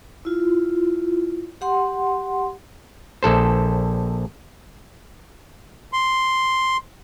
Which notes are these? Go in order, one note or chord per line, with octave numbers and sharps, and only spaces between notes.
E4 F4
G4 F#5 C6
A#1 A4 C5
C6